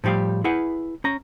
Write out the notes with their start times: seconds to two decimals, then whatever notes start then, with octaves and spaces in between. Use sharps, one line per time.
0.04 A2 F3 G3 G4 F5
0.44 E4 G#4 B4 F#5
1.04 C#4 A#5